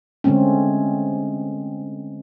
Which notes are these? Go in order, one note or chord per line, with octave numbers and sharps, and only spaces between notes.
D3 G#3 A3 C4 C#4